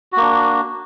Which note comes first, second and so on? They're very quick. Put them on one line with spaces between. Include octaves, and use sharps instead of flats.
F#4 A#3 D4